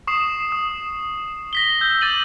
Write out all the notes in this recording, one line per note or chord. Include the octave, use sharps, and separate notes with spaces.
C#6 D#6 C7 E7
D#6
A#6 B6 G7
E6 G6
D6 A6 D#7 F#7